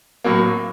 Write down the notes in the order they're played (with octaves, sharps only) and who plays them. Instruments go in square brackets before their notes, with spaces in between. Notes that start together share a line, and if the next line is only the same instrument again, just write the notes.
[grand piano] A2 F#3 A#3